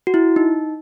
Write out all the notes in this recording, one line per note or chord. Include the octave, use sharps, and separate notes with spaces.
F#4
E4
D#4